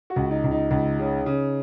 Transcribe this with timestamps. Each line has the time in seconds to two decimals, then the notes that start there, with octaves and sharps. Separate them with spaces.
0.10 F#4
0.16 C#2
0.31 D#4
0.44 C#2
0.51 D#4
0.71 C#2
0.99 C#3
1.26 C#3